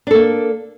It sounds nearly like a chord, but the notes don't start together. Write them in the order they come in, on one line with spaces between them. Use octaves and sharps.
D4 A4 A#3